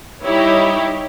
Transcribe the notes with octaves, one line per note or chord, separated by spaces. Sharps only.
G3 D#4 E4 G4 C#5